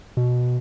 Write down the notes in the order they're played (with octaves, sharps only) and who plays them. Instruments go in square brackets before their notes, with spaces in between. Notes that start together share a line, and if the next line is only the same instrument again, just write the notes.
[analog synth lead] B2